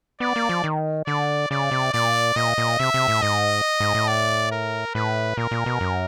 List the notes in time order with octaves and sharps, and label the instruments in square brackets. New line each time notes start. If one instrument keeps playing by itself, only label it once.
[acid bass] B3 [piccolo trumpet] D5
[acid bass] A#3
F3
D#3
[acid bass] D3 [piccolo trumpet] D5
[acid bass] C#3 [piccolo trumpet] D5
[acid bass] C3
[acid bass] A#2 [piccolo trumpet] D5
[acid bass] A#2 [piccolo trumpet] D#5
[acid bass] A#2
[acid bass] C3 [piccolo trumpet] E5
[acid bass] C3
A2
[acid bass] G#2 [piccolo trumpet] D#5
[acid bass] G#2
A2
[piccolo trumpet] D5
A#4
[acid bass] A2 [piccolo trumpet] B4
[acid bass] A#2 [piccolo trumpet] A#4
[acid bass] A#2
B2
F#2